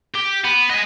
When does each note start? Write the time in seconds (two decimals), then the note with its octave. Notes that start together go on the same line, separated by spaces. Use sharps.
0.15 G4
0.44 B3
0.70 D#5 G#5